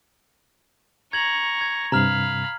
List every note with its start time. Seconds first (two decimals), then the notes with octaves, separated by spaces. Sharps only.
1.13 A#5 C#6 G#6 F#7
1.61 G#6
1.92 G2 C3 F5 A#5 B5 F6